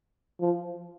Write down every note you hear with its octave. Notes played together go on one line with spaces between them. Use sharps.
F3